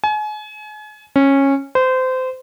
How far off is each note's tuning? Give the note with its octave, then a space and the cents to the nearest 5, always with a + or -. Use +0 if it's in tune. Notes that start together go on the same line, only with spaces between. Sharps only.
G#5 +35
C#4 -15
C5 -25